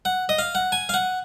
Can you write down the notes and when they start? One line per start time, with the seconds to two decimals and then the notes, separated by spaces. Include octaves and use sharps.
0.05 F#5
0.29 D#5
0.39 F5
0.55 F#5
0.72 G#5
0.89 F5
0.94 F#5